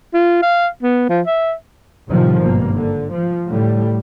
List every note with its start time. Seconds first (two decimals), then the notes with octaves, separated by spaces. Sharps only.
0.14 F4
0.42 F5
0.83 B3
1.09 F3
1.26 E5
2.08 A1 A2 C3 D#3 F3 G3
2.41 G#1 G2 B2 A#3
2.75 D3
3.12 F3
3.49 A2 D3 G3